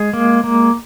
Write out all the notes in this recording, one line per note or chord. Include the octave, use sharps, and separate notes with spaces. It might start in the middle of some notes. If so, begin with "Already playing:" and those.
Already playing: G#3 G#4
A#3
A#3